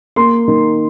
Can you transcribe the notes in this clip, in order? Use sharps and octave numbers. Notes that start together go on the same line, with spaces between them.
A#3 C6
D#3